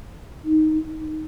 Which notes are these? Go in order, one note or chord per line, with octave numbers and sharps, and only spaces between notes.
D#4